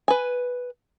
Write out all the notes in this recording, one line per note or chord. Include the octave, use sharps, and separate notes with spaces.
B4 G#5